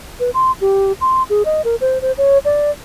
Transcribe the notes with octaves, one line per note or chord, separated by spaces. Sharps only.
B4
C6
G4
C6
G#4
D#5
A#4
C5
C5
C#5
D5